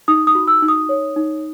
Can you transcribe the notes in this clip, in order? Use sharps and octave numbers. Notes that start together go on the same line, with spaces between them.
D#4 D#6
D#6
F#4
E6
D#4
D#6
C#5
D#4